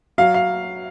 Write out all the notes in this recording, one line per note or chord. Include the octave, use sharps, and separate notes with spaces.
F#3 F5
F5